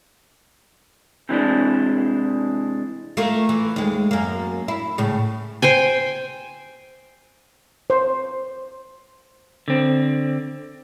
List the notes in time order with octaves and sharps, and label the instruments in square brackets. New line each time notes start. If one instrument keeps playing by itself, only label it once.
[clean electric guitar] C3 E3 G#3 D4
[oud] A3 A#3 F4
E3
D#2 G#3
F#2 A#3
E4
A2 C#3
[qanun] C5 G5 G#5
[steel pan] C5
[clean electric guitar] D3 C4